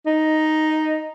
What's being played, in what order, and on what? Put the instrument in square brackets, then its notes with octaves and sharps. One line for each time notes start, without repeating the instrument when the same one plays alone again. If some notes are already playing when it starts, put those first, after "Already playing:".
[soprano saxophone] D#4